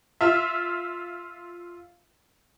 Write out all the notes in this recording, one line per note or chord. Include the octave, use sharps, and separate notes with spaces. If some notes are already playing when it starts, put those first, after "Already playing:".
F4 E5